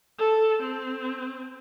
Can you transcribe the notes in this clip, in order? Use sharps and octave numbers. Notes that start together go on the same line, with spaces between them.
A4
C4